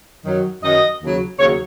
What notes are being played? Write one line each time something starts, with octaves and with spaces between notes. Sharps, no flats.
F#2 D#3 F#3
F#2 D#3 F#3 D#5
D#2 C#3 F#3
D#2 C#3 F#3 C#5